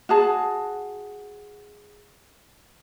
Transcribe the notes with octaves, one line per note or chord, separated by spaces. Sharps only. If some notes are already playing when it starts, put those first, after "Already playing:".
F#4 G#4 A5